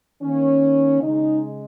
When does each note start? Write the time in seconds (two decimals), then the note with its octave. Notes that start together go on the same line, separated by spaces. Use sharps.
0.22 D#3 A#3 C#4
1.02 C#3 G#3 D#4